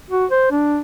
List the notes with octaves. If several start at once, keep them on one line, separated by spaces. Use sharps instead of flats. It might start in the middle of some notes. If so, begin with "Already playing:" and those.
F#4
C5
D4